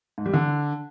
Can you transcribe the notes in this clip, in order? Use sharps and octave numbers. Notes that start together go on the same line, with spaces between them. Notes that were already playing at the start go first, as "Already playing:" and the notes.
G#2
G3
D3